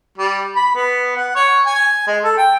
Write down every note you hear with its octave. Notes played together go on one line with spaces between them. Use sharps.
G3
B5
B3
F#5
C#5
G#5
G#3
A4
G5